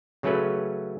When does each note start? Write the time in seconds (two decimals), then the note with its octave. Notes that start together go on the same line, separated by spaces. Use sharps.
0.23 C#3 F#3 A3 C#4 B4